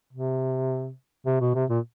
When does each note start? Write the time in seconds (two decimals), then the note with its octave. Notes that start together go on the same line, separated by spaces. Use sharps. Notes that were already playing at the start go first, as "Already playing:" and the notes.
0.13 C3
1.26 C3
1.41 B2
1.55 C3
1.70 A#2